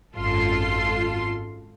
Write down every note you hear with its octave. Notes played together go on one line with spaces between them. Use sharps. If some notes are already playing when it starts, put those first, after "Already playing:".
G#1 F#2 F4 A4 C6